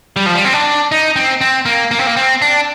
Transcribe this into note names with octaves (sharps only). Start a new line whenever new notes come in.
G3
F3
G3
C4
D4
D#4
C4
C4
A#3
A#3
C4
A#3
C4
D4